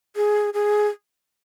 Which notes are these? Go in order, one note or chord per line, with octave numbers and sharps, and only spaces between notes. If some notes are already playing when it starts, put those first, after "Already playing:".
G#4
G#4